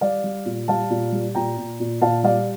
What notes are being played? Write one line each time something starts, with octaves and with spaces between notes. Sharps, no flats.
G3 D5 F5
G3
A#2
G3 F5 A5
A#2
G3
A#2 G5 A#5
A#2
A#2
A#2 F5 A5
G3 D5 F5